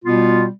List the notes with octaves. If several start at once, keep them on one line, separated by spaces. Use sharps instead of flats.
B2 G3 B3 F4